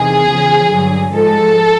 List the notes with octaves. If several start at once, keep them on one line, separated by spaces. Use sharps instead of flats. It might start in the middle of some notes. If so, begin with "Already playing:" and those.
Already playing: E2 C3 D#3 G#4
E2 C#3 F3
G2 D3 F#3
G#2 F3 G#3 A4